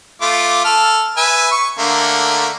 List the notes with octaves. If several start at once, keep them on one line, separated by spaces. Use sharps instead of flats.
A3 F4 D6
A4 F6
B4 E5 G#5
C#6
D3 A3 A#3